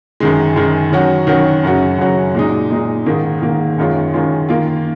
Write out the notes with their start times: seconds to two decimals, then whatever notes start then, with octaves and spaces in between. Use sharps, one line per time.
0.20 F#2 D#3 G#3
0.56 F#2 D#3 G#3
0.92 D#3 F#3 C#4 F#4
1.27 D#3 F#3 C#4 F#4
1.63 F#2 C#3 F#3 C#4 F#4
1.98 F#2 C#3 F#3 C#4 F#4
2.35 A#2 G#3 D#4
2.71 A#2 G#3 D#4
3.06 G#2 D#3 A#3
3.41 G#2 D#3 A#3
3.78 F#2 D#3 G#3 C#4 F4
4.14 F#2 D#3 G#3 C#4 F4
4.49 D#3 A#3 F4